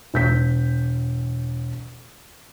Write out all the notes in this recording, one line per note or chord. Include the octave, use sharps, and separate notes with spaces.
E1 G6 B6